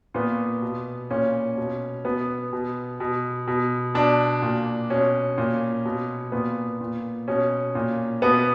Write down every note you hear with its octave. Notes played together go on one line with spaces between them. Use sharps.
A#2 B3
B2
A#2 C#4
B2
B2 B3
B2
B2
B2
B2 D4
A#2
B2 C#4
A#2
B2
A#2 B3
A#2
B2 C#4
A#2
B2 B3